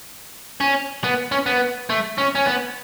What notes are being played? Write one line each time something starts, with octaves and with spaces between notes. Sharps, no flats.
C#4
B3
C#4
B3
A3
C#4
C#4
B3